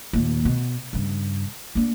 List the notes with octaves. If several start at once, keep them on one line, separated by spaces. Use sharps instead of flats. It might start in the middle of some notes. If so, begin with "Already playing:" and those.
D#2 A#2
B2
G2 C#3
A#3 D4